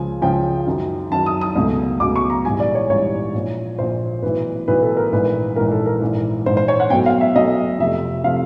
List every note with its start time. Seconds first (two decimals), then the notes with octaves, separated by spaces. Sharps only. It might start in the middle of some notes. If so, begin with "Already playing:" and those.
Already playing: C#2 C#3 F3 G#5
0.22 C#2 C#3 F3 G5
0.66 F#2 D#3 F#3
1.11 F#2 D#3 F#3 A5
1.26 D#6
1.41 D#6
1.55 C#2 B2 F#3 A3
2.00 C#2 B2 F#3 A3 D6
2.16 C#6
2.30 A#5
2.45 A#1 G#2 E3 G3 G#5
2.60 D5
2.75 C#5
2.89 A#1 G#2 E3 G3 C#5
3.33 A#1 A#2 F3
3.79 A#1 A#2 F3 C5
4.23 B1 A2 E3 B4
4.68 B1 A2 E3 B4
4.82 A4
4.97 A#4
5.12 A#1 G#2 E3 B4
5.56 A#1 G#2 E3 A#4
5.72 A4
5.86 A#4
6.01 A#1 G#2 E3
6.46 A#1 G#2 E3 C5
6.57 C5
6.68 C#5
6.80 F#5
6.90 B1 B2 F#3 A3 G5
7.06 F5
7.21 E5
7.35 B1 B2 F#3 A3 D#5
7.79 F2 C3 F3 A3 E5
8.24 C3 F3 A3 F5